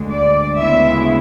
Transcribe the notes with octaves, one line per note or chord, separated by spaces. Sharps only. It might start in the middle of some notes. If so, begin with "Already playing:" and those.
Already playing: D2 D3 G#3
D5
D2 C#3 G#3 B3 E4 E5